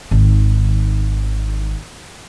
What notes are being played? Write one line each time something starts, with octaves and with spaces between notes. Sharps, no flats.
G#1 D#3